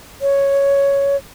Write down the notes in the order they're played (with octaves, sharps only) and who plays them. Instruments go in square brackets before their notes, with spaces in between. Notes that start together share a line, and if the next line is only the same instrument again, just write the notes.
[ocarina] C#5